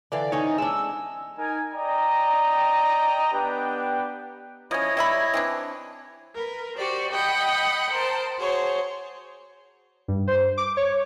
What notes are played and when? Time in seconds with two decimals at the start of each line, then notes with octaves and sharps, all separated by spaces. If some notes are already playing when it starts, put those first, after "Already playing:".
0.12 D3 E3 D5 F5
0.32 C4 C#4 D#4 C#5
0.58 G#3 D4 E6
1.38 D#4 A#4 G#5
1.73 D5 D#5 G5 A#5
3.33 B3 D4 G4 B4 G5
4.71 F3 C#4 E4 C#5 D#5
4.97 G3 E5 B5
5.34 E3 C4 D4
6.34 A#4 B4
6.77 F#4 G4 C5 D5
7.10 D#5 F#5 G5 B5
7.90 A#4 C5 A5
8.38 F#4 G#4 C5 C#5
10.08 G2
10.27 C5
10.57 D6
10.77 C#5